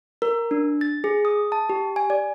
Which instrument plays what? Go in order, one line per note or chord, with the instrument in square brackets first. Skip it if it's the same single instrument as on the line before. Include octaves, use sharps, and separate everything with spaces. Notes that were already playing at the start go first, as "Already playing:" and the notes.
[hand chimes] A#4
D4
A6
G#4
D#6
A5
G4
G#5
D5